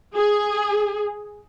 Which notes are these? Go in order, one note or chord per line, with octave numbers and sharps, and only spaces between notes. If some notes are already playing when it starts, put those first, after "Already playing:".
G#4